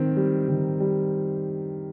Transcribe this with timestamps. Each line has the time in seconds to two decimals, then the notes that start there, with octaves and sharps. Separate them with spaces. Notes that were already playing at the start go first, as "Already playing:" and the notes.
Already playing: D#3 C4
0.16 G3
0.48 D#3
0.80 G3